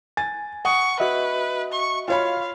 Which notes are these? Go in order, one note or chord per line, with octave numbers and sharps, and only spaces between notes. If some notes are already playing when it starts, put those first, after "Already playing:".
G#5 A6
F#5 C#6 D#6
F#4 B4 D#5 E5
C#6
F4 C#5 F5 B5